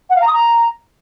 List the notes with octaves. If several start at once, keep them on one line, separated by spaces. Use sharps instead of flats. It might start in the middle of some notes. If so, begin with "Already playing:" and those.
F#5
F5
A#5
D#6
A#5